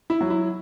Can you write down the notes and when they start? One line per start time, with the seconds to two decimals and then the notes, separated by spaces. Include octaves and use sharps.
0.10 E4
0.21 F#3
0.30 E4